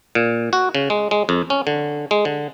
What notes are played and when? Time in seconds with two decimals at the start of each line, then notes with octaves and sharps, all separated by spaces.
0.15 A#2
0.53 F#4
0.75 C#3
0.90 G#3
1.11 G#3
1.29 F2
1.50 C#4
1.67 D3
2.11 G#3
2.25 D3